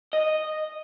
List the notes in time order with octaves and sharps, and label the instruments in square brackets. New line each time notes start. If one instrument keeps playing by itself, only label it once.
[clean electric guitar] D#5